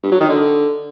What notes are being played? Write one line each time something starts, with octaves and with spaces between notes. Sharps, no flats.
G2
F#3
D#3
D3